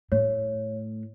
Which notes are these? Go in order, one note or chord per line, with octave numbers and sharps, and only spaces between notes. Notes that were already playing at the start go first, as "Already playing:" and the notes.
A2 C#5